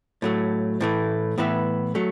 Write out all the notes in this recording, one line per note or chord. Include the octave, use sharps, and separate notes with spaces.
A2 F#3 A3
A2 E3 A3
A2 E3 B3 E4
F#3 A3